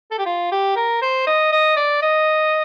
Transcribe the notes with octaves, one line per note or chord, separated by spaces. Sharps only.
A4
G4
F4
G4
A#4
C5
D#5
D#5
D5
D#5